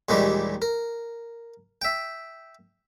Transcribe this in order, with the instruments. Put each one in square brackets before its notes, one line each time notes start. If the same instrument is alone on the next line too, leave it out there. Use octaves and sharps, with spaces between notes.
[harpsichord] D#2 A#2 D#3 E3 G3 G#3
A#4
E5 G5